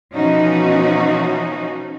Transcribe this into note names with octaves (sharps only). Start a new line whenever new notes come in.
B2 E3 F3 C#4 D#4 F#4